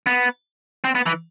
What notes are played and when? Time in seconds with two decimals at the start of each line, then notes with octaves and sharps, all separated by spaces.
0.07 B3
0.84 C4
0.95 B3
1.06 E3